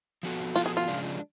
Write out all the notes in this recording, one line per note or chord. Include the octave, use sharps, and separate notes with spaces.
F3 B3 F#4 A4
F3 B3 F4 F#4 A4
G#4
F4
C#3 F3 G#3 D4